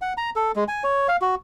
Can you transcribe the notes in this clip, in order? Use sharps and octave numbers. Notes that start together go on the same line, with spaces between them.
F#5
A#5
A4
G#3
G#5
C#5
F5
F#4